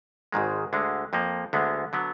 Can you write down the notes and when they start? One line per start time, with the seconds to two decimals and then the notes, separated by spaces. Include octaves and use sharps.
0.32 G#1 G#2 D#3 G#3
0.73 D2 D3 G#3
1.13 F2 F3 A#3
1.53 D2 D3 G#3 B3
1.93 D3 F#3 B3